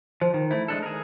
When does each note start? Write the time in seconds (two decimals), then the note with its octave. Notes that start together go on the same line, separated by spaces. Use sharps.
0.21 F3 C5
0.34 D#3
0.51 A3 E4
0.68 G#3 D4 A4
0.83 G#4 A#4